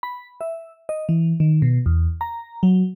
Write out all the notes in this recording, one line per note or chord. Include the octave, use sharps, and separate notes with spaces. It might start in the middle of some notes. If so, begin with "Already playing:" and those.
B5
E5
D#5
E3
D#3
B2
E2
A#5
F#3